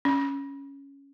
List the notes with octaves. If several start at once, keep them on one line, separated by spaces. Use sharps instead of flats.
C#4